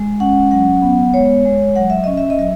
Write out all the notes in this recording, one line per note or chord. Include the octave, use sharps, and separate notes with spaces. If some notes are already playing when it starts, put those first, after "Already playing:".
Already playing: G#3
C#4 F#5
F#3 F#5
B3
G#3 C#5
G#3
F#3 F#5
E5
C#4 D#5
E5
D#5
F#3 E5